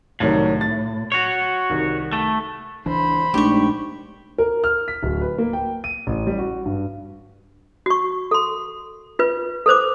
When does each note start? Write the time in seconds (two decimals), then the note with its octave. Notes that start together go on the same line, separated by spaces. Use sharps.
0.20 C2 A2 D#3 F#3
0.61 A6
1.12 F#4 C#5
1.69 C2 D#3
2.13 A3
2.86 C#2 E3 D4 C5 B5
3.34 A#1 G#3 A3 D4 D#4 G4 C#6
4.38 A#4
4.64 F6
4.88 B6
5.03 D1
5.21 B4
5.38 A#3
5.53 G5
5.84 D#7
6.07 A1
6.27 G3
6.38 F#4
6.65 G2
7.86 F#4 C#6
8.31 A4 C6
9.19 F4 B4
9.66 A4 B4 C5 D6